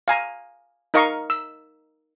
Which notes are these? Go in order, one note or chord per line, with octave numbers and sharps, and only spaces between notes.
F5 G#5 A#5
D#4 A#4 D#5 F5 A#5 C#6
E6